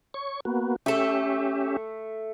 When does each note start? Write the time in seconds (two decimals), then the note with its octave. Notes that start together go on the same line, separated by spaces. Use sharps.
0.14 C#5 C#6
0.45 A#3 B3 F#4
0.86 A3 C#4 G4 A4 E5